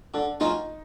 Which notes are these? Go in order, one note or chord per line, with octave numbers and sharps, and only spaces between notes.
D3 D4
F#3 A#3 C#4 D#4 F4